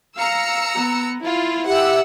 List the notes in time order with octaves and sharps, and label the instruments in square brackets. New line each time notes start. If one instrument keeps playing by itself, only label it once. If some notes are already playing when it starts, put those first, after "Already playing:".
[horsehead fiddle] F5 [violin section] A#5 E6 C#7
[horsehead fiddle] B3
[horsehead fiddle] E4 [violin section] F4
[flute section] G4 E5 [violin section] F#5 E6